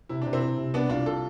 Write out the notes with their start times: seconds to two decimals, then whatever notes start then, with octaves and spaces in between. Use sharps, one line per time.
0.09 C3 E4
0.22 C3 D4
0.33 C4 E4
0.42 C3
0.57 C3
0.74 C2 B3 D4
0.90 C2 D4 F4
1.06 F4 A4